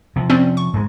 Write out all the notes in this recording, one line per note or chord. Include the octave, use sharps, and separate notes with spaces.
C3 F3
C4 C#4 D5
C#6
G#2 G#3